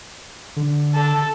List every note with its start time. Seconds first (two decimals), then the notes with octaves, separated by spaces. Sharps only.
0.57 D3
0.95 A4